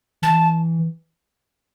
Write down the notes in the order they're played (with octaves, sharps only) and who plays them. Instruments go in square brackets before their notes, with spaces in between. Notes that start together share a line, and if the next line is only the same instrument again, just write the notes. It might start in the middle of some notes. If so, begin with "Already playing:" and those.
[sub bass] E3 [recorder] A5